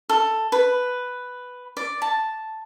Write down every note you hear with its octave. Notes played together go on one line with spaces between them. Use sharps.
A4
B4
D5
A5